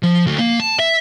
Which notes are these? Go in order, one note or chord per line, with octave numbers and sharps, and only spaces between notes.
F3
D2
A#3
A5
E5